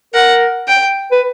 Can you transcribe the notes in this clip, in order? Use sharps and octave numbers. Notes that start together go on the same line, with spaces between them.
A#4 F#5
G5
B4